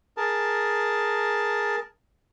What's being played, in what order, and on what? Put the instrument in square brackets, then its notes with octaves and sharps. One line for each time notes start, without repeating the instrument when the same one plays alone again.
[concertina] G#4 A#4 A5